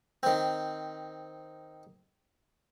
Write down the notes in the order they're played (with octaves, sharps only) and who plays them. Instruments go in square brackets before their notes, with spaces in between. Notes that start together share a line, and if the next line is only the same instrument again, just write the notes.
[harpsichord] D#3 C4